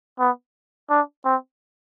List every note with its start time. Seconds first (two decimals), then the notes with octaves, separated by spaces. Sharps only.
0.20 B3
0.90 D4
1.25 C4